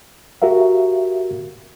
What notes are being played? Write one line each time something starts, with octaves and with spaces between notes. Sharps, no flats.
F#4 G4 A#4 E5 F5